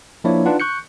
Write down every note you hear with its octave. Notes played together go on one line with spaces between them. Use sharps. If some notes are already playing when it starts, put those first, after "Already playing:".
F3 A#3 D4 E4 C#5 D5
D4 D#4 F4 B4 F#5
C#6 F#6 G6 C#7